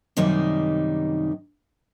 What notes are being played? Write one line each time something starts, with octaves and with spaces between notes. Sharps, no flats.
F#2 C3 D#3 G3 A#3 D#4